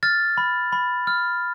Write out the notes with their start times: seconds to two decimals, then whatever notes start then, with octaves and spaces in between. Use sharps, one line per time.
0.03 F6 A6
0.38 B5
0.72 B5
1.07 F6